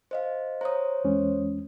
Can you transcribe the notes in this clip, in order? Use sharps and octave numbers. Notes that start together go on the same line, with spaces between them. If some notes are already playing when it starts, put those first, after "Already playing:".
C5 D#5 F5
C5 C#5 A#5 D#6
E2 G#3 C#4